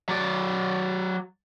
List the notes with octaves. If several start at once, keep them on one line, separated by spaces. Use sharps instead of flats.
F#3 D5